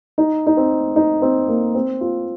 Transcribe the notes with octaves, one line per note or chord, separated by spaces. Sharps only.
D#4
D#4
C4
D#4
C4
A#3
C4
F4